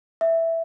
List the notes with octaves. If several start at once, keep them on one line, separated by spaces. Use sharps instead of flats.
E5